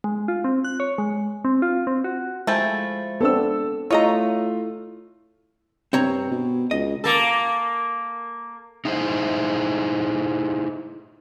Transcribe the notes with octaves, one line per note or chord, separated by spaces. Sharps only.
G#3
F4
C4
F#6
C#5
G#3
C4
F4
C4
F#4
F3 G#3 A3 E4 G5 G#5 A6
B3 C4 D4 A4 E6
A3 E4 F4 C#5 D#5 A#5
G2 C4 C#5 A#5
B2
C#2 D#5
A#3 A4
D#4 E4 G#4 A4 C5